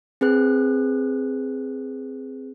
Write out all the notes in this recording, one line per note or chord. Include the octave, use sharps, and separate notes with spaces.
C4 G#4 B4 F#6